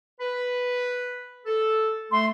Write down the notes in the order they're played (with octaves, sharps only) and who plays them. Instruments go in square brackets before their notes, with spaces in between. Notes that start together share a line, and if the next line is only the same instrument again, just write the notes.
[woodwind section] B4 B5
A4
[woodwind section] A3 [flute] C6